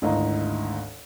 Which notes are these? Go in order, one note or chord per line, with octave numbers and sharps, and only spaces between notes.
G#1 D2 E4 D#5 F5 A#5